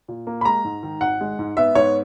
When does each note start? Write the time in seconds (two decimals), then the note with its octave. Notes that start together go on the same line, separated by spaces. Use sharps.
0.08 A#2
0.27 A#3
0.41 B5
0.45 G#3 A#5
0.65 G#2
0.83 D#3
1.01 G#1 F#5
1.21 G#3
1.39 G#2
1.57 B3 E5
1.75 G#2 C#5